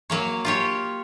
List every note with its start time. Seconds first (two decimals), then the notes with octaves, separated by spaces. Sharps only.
0.10 F#3 A#3 C#5
0.45 F4 G4 C#5